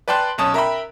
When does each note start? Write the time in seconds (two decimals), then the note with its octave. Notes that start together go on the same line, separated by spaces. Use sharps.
0.08 B4 D5 G5 A5 C6 F#6
0.38 B1 C#4 A5 D#6
0.54 A#4 E5 G5 B5